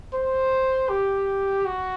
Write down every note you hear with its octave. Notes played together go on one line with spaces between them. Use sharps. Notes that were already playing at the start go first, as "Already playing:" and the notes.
C5
G4
F#4